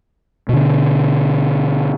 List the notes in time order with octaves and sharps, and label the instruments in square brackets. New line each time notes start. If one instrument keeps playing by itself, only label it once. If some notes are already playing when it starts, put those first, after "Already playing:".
[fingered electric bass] B2 D3